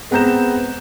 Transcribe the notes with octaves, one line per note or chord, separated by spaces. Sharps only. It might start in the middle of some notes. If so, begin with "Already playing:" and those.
G#3 B3 C4 A#5 G6 E7